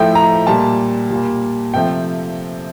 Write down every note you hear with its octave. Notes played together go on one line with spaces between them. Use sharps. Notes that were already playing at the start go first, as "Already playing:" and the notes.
Already playing: A2 F3 A3 G5
A#5
A#2 G3 A5
A#2 G3
C3 F3 A3 G5